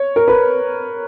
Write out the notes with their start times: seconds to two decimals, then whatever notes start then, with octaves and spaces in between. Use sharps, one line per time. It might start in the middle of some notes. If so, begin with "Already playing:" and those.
Already playing: C#5
0.16 A#4
0.28 B4